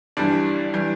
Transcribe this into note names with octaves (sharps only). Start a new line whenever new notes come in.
G1 G2 E3 G3 D4
E3 G3